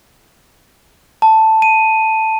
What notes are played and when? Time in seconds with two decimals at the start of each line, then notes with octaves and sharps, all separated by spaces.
1.22 A5
1.62 D#7